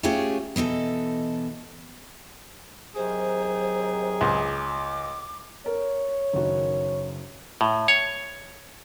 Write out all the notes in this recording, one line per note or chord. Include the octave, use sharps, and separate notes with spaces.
A3 C#4 F4 G4 G#4 F#5
B2 E3 D#4 A4
C3 D#3 F#3 G#4 C5
C#2 D6
A#4 C#5
F#1 D#3 F#4
A2
C#5